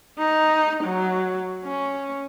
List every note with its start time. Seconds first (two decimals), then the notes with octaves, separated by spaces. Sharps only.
0.18 D#4
0.84 F#3
1.65 C#4